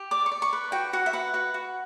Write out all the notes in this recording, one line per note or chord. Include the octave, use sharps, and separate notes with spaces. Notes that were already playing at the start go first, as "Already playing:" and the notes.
Already playing: G4
D5 D6
C#6
D5
C#6
B4
F#4 G5
F#4 F#5
E5
B4 F#5
F#4 F#5
F#4